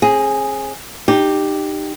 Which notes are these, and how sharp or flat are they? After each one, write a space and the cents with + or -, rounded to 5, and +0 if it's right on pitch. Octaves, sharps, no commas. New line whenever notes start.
C4 +40 G#4 +0
D#4 -25 G4 +0